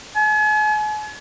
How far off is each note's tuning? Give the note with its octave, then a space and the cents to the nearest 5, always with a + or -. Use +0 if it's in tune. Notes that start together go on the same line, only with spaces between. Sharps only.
G#5 +40